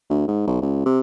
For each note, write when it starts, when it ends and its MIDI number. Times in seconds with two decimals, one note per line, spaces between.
0.10 0.24 38
0.28 0.44 44
0.47 0.58 35
0.62 0.82 37
0.86 1.01 48